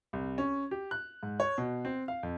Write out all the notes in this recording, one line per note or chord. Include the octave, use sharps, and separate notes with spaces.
C2
C#4
G4
F#6
G#2
C#5
B2
C4
F5
F2